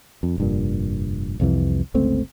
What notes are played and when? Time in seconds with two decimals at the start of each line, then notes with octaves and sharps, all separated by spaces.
0.23 F2
0.38 F1 G2 A#2
1.40 C2 F2 C3 E3
1.94 G1 C#2 A3 C4